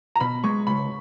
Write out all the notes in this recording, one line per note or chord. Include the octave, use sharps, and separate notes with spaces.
A#5
B2 B5
G#3 C#6
C#2 B5